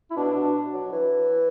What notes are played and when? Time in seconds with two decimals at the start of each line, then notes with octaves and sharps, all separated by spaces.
0.11 E4
0.16 B2 D4
0.36 B2
0.74 F#3
0.92 E3